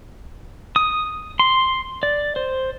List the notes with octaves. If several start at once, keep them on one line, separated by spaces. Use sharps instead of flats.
D#6
C6
D5
C5